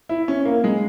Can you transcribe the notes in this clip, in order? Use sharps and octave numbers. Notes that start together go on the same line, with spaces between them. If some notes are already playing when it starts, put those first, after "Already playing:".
E4
C#4
A#3
G#3